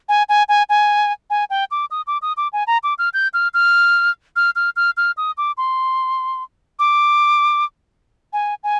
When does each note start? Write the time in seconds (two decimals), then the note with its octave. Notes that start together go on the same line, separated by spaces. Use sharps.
0.09 G#5
0.29 G#5
0.49 G#5
0.69 G#5
1.30 G#5
1.50 G5
1.71 D6
1.91 D#6
2.07 D6
2.22 D#6
2.37 D6
2.53 G#5
2.67 A#5
2.83 D6
2.98 F6
3.14 G6
3.34 F6
3.54 F6
4.36 F6
4.56 F6
4.76 F6
4.97 F6
5.17 D#6
5.37 D6
5.58 C6
6.79 D6
8.33 G#5
8.63 G#5